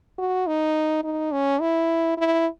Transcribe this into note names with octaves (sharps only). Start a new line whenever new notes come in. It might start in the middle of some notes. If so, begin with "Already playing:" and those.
F#4
D#4
D#4
C#4
E4
E4